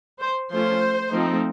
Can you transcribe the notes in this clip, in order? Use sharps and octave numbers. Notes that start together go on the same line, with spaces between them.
C5
F3 A3 C#4 F4 C5
F3 A3 C4 D#4